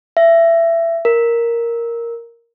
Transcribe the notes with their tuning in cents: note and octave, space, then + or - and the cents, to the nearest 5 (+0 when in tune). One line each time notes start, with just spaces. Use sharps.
E5 +20
A#4 +0